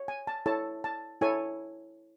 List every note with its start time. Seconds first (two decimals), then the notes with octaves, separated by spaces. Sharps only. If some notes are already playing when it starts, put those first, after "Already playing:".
Already playing: C#5
0.08 G#5
0.27 A5
0.46 E4 A4 C#5 A5
0.84 A5
1.21 E4 A4 C#5 G#5